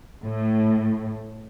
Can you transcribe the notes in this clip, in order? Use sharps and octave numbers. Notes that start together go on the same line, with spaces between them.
A2